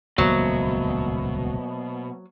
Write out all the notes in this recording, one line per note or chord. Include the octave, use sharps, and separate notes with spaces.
D#1 C#2 B2 F#3 A#3 C5 E5